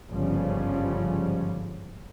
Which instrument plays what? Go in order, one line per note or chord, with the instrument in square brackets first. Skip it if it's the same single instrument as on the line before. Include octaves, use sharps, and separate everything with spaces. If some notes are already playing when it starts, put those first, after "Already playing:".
[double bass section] G1 G#2 C#3 F3 G3 C#4